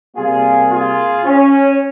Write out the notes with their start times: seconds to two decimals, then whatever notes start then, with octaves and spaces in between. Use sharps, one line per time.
0.14 C3 G3 A#3 F4 G#4
0.70 F4 G#4
1.25 C#4